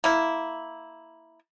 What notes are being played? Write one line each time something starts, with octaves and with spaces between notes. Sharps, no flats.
A#3 E4